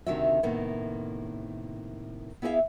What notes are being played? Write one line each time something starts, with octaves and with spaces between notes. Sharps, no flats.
D2 C3 D#3 D4 F#4 E5
A2 C3 D#3 A#3 B3
B3 E4 G#4 B4 E5 F5